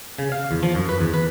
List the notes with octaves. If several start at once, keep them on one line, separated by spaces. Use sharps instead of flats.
C#3
F5
E2
F3
F#2
B4
E2
B4